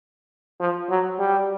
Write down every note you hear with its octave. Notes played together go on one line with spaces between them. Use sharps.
F3
F#3
G3